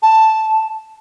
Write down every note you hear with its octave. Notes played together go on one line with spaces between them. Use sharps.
A5